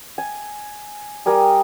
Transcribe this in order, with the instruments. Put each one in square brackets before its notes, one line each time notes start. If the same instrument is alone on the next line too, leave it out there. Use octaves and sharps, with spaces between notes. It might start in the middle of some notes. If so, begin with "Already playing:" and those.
[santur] G#5
G3 A#4 G#5 D#6